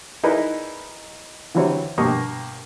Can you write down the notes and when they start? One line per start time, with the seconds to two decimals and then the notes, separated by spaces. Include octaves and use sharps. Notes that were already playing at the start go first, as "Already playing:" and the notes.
0.23 D#4 E4 G#4 A#4 B4 D5
1.55 D3 E3 F#3 G3 C4 C#5
1.98 G2 B2 A#3 G4 C#6 D#6